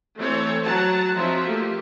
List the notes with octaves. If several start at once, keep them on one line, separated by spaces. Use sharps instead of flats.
E3 A3 C4 A4 C5 C#5
F#3 F#5 A5 A#5
F3 F#3 C4 D#4 E5
A3 A#3 G4